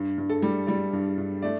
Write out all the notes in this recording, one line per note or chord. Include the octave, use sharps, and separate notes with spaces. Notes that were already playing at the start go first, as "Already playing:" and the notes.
Already playing: G2
G2
A4
G3
G3 D5
G2
G2
A3 D5